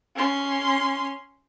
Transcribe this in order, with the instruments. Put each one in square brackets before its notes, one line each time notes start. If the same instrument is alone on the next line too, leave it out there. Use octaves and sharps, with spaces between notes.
[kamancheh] C#4 C6